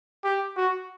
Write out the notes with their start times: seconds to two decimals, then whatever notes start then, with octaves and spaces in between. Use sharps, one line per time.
0.24 G4
0.57 F#4